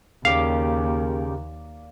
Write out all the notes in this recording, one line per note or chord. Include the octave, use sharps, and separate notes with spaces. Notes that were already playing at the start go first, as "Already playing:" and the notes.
D#2 C#3 A#3 G4 D5 F5 D6